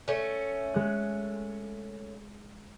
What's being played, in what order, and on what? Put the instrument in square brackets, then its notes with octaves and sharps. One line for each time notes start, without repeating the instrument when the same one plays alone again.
[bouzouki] A3 C#4
[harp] G#3 F#6